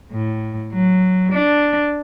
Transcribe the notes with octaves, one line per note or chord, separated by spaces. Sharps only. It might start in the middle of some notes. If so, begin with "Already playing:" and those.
A2
F#3
D4